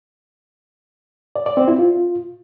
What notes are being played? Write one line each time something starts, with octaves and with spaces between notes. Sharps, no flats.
D5
D5
C4
E4
F4